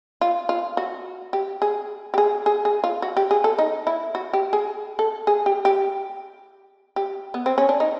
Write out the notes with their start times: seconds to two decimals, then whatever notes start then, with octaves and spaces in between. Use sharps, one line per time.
0.21 F4
0.49 F4
0.77 F#4
1.33 G4
1.62 G#4
2.14 G4
2.18 G#4
2.46 G#4
2.65 G#4
2.84 F4
3.02 F#4
3.17 G4
3.31 G#4
3.44 A4
3.59 D#4
3.87 E4
4.15 F#4
4.33 G4
4.53 G#4
4.99 A4
5.27 G#4
5.46 G4
5.65 G4
6.96 G4
7.34 B3
7.46 C4
7.58 C#4
7.69 D4
7.80 D#4